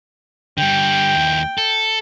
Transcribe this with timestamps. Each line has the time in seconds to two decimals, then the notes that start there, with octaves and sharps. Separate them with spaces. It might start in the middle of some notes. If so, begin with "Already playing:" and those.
0.58 D3 G3 G5
1.15 D#2 E4
1.58 A4